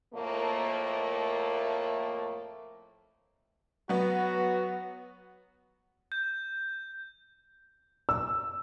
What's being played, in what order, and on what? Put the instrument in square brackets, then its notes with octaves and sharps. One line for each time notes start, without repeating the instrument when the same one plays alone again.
[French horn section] F2 A2 A3 A#3
[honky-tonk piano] F#3 B3 [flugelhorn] F#4
[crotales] G6
[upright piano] E6